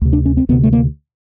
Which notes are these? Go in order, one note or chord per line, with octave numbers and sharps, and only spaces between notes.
D2 C3
D4
C#4
C4
D2 C3 B3
A3
A#3